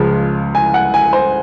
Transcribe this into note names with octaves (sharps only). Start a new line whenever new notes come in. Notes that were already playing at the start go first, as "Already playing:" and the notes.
Already playing: C#2 C#3 F3 G#3
G#5
F#5
G#5
C5